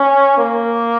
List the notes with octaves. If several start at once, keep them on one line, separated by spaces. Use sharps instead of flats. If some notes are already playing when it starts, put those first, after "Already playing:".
Already playing: C#4
A#3